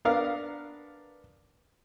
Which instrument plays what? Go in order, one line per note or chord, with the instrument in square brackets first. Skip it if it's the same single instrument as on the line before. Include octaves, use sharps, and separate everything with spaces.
[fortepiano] B3 D4 A#4 F5